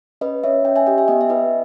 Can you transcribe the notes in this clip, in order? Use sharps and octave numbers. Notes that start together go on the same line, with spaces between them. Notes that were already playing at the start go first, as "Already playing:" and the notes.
C#4 B4 D#5
C#4 C#5 E5
C#4 D#5 G5
E5 G#5
G4 D#5 G5
E5 G#5
B3 D#5 G5
E5
E4 B4 D#5